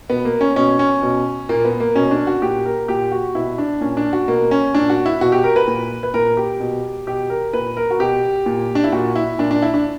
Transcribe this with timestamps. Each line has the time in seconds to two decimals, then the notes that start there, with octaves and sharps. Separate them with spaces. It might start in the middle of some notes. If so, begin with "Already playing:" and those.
0.10 B2 B3
0.25 A#3
0.41 C#4
0.56 B2 C#4
0.79 C#4
1.03 B2
1.49 A#2 A#3
1.65 B3
1.80 A#3
1.95 B2 C#4
2.11 D4
2.27 F#4
2.42 A#2 G4
2.65 A#4
2.88 A#2 G4
3.12 F#4
3.35 B2 E4
3.58 D4
3.81 A#2 C#4
3.97 D4
4.13 F#4
4.28 B2 A#3
4.51 C#4
4.74 A#2 D4
4.90 F#4
5.06 E4
5.21 B2 F#4
5.32 G4
5.44 A#4
5.56 B4
5.67 A#2
6.03 B4
6.14 A#2 A#4
6.37 G4
6.60 B2
7.07 B2 G4
7.30 A#4
7.53 A#2 B4
7.77 A#4
7.90 F#4
8.00 B2 G4
8.46 A#2
8.75 D4
8.84 E4
8.92 A#2 F#4
9.16 E4
9.39 A#2 D4
9.51 D4
9.62 E4
9.74 D4